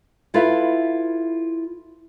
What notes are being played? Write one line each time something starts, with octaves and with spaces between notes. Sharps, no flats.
E4 F4 A4 B4 E5 F5